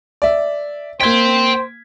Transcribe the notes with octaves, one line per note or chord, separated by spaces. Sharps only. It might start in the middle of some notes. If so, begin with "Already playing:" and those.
D5 E5
A#3 C5 G5 C6 G#6 B6